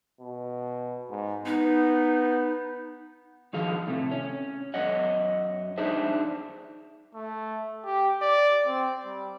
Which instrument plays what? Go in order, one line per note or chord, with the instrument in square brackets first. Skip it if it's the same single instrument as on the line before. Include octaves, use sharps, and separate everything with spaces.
[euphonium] B2
G#2
[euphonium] B3 [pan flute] D#4
[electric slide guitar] D#3 F3 G#4 F5
A2 C3 A3
C#4
F#2 C#5 D#5 F#5
D4 D#4 G#4 C5 E5
[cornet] A3
G4
D5
C4
G3